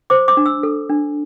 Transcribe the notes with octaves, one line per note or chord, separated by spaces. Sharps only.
C5 D6
D6
D4
E6
A4
D4